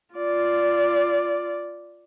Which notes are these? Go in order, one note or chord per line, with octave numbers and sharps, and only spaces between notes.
F4 D5